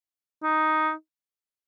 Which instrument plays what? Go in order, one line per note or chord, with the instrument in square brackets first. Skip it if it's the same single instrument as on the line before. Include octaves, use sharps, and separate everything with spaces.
[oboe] D#4